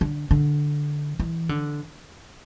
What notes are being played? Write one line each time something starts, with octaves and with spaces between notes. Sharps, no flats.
D3
D3
E3
D3